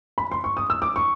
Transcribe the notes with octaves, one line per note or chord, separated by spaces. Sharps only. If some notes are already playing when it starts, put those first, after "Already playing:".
B5
C6
C#6
D#6
E6
D6
C#6